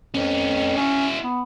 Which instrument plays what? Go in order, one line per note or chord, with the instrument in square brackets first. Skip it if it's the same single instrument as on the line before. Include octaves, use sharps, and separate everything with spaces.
[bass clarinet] F2 [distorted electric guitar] B3 C#4
[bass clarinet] C#4 [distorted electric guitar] E4 F#4
[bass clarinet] B3